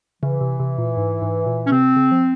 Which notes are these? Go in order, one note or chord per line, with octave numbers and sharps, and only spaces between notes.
C#3 E3
C3
C3
A#2
G#2
G#2
A#2
C#4
C3 C4
C#3
F3